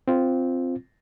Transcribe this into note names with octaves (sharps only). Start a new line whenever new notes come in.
C4 F4